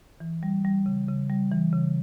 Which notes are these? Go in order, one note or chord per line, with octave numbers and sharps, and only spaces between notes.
E3
G3
G3
C#3
C#3
G3
E3
C#3